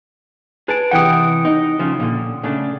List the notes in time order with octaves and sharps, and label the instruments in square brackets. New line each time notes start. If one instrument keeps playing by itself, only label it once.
[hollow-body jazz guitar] G#4 A5 [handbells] B4 D7
[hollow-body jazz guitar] C3 E3 A4 [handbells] F#5 G5 D#6
[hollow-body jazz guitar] D#4
C#3 F3
A#2 D3
C#3 A3 D4